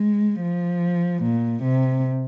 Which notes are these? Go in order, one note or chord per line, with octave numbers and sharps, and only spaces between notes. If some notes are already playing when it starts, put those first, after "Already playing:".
Already playing: G#3
F3
A#2
C3